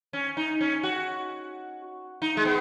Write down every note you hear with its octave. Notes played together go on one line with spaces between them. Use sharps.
C#4
D#4
C#4
F#4
D#4
G#3
B3